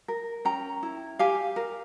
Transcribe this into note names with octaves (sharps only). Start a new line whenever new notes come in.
A#4
C#4 G5 A#5
E4
G4 F5 G#5
A#4